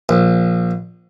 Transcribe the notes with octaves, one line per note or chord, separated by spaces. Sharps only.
A#1